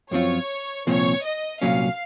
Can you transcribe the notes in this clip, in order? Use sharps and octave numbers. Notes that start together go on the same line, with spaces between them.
F#2 F3 C4 F4 C#5
C2 A#2 F3 C4 C#5
D#5
C2 A#2 F#3 C#4 F5